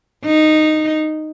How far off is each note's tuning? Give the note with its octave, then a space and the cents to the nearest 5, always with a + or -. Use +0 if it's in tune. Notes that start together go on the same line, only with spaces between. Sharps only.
D#4 -10